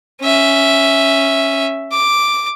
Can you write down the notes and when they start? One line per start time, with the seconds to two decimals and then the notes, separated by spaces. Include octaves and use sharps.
0.22 C#4 E5
1.91 D6